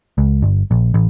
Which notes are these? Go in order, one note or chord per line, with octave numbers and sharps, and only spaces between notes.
C#2
G1
A#1
A1